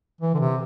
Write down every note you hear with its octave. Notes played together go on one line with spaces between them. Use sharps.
E3
D3
C3